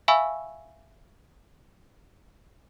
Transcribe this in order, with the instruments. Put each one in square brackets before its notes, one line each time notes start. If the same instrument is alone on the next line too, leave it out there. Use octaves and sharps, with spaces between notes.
[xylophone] E5 F5 G#5 B5 C#6 E6